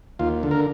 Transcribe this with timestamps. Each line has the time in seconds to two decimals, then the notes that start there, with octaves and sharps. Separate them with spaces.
0.19 D#2 F4
0.43 D3
0.51 A#4